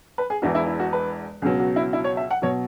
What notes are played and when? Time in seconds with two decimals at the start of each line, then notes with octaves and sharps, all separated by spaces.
0.18 B4
0.30 G#4
0.42 E1 E2 E3 F#4
0.55 E4
0.67 E4
0.80 F#4
0.93 B4
1.42 C#2 B2 F#3 G#4
1.60 F#4
1.76 E4
1.93 E4
2.04 C#5
2.17 E5
2.31 F#5
2.42 B2 F#3 C#5